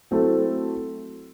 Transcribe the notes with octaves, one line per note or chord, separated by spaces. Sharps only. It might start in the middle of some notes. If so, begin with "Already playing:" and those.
F#3 A3 C4 E4 A4